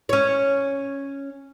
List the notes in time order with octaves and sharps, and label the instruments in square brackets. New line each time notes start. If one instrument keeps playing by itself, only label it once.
[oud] C#4 C#5